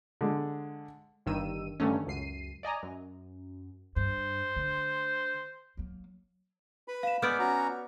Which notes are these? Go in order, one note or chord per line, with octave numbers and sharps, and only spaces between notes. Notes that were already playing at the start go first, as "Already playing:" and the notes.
D3 G#3
G1 G2 D#3 E6 D#7
G2 D3 D#3 A3 C#4
C#2 F#2 C7 D#7
D5 D#5 G#5 A#5
F#2
G2 C5
D3 A3
F#3 A#3
B4 B5
F5 E7
G#3 B3 D5 D6 E6 F6 G6
C#4 F#4 A#5